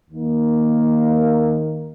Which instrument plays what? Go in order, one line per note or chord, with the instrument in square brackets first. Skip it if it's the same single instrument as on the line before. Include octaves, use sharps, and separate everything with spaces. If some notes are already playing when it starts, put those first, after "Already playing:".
[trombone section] D#2 D#3 A#3